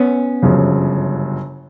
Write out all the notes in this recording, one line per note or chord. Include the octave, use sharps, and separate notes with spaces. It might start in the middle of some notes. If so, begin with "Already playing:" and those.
Already playing: B3 C#4
G1 F#2 C#3 F3